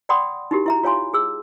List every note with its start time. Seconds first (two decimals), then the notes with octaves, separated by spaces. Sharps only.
0.09 D5 F#5 G5 B5 C6 D#6
0.51 D#4 E4 F#4 G4 A#4
0.66 E4 E5 A#5
0.83 F4 C#5 F5 G#5 C6
1.14 G#4 E6